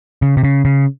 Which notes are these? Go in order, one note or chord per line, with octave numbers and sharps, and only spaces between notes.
C#3
C3
C#3
C#3